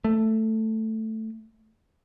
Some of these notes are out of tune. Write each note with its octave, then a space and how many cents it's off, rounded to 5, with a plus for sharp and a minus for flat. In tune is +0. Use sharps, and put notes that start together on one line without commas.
A3 +5